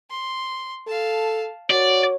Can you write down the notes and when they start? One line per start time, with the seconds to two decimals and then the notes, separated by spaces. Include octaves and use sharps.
0.10 C6
0.87 A4 F5 A5
1.70 F#4 A#4 C#5 D5